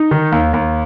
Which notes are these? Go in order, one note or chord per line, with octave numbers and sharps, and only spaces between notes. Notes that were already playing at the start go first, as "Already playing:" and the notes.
Already playing: D#4
D#3
D#2
D#2